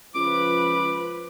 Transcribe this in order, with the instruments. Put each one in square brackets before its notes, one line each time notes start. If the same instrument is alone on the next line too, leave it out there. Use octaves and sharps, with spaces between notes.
[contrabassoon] C#2 [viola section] F3 B4 [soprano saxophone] D6